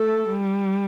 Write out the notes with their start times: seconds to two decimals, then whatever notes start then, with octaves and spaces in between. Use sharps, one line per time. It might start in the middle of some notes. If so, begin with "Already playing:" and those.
Already playing: A3 A4
0.30 G3